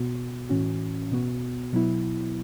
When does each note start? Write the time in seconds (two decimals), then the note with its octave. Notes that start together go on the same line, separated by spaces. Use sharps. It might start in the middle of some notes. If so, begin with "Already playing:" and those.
Already playing: B2 B3 F#4
0.49 A2 E3 C#4 F#4
1.11 B2 B3 F#4
1.72 B2 F#3 B3 E4